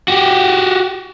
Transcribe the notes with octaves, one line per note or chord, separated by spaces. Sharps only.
F#4 G4